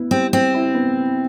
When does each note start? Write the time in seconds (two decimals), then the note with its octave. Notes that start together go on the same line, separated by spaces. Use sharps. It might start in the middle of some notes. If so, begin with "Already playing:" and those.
Already playing: B3 E4
0.11 G3 C4
0.32 G3 C4
0.54 E4
0.75 B3